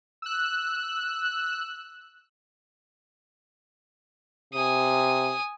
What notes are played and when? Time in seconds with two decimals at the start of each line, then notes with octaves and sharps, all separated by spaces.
0.22 E6 F#6
4.54 C3 G#5 D#6